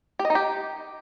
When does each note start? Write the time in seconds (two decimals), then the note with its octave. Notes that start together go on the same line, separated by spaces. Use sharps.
0.19 G4
0.25 D#5
0.30 D#4
0.35 G4